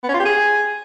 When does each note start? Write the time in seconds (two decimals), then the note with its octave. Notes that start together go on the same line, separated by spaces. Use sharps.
0.04 B3
0.09 C#4
0.14 F4
0.20 G4
0.25 G#4